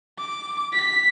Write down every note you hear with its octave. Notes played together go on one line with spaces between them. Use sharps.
D6
B6